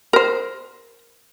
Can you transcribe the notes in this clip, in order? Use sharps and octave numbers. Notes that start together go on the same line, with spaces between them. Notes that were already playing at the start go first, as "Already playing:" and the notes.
A#4 C5